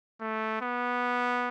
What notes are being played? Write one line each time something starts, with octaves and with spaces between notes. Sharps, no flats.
A3
B3